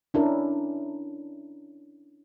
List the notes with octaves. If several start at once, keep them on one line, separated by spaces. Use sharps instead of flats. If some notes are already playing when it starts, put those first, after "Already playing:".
C#4 D4 E4 A#4